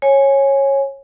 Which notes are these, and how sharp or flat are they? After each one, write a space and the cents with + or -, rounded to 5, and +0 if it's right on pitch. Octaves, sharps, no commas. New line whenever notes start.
C#5 -15 G#5 +0